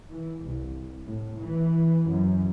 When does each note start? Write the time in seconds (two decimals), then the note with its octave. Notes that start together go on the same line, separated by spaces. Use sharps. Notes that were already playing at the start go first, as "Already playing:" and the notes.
0.10 E3
0.42 C2
1.04 A2
1.40 E3
2.08 F#2